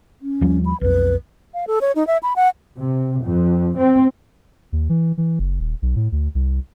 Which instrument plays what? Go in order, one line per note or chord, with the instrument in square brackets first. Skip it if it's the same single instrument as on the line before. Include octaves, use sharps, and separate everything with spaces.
[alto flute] C#4
[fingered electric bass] D#2 F3 G3
[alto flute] B5
[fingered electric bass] B1 F2 [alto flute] B4
[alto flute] F5
A4
C#5
D#4
E5
B5
F#5
[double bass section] C3
F2
C4
[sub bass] D#2
E3
E3
F#1
D#1
B1
A2
D2
C2